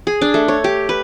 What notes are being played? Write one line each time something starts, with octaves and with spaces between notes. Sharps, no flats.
G#4
D4
A3
C#5
G4
B4